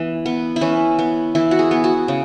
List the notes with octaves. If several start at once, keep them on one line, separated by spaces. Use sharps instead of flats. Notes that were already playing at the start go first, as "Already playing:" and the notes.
Already playing: E3 B3
B3
E4
E3 C#4
B3
E3 E4
F#4
G#4
B3
F#4
C#3